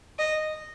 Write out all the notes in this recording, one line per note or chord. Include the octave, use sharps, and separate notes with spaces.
D#5